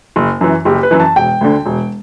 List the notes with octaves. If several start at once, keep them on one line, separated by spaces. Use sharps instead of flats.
F#1
F#2 E3
F#1 G4
B4
F#2 E3
A5
E1 G5
D2 D3
E1